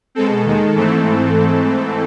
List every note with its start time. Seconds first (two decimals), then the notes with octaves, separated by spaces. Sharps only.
0.15 B2 G#3 C4 A4
0.44 D#2 D#3 G#3
0.75 G#2 E3 A3 C4